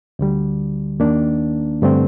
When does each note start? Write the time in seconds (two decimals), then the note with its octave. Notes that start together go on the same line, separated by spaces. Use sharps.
0.19 D2 D3 G3
1.00 D#2 D#3 A#3 D4
1.82 G2 D3 A3 C4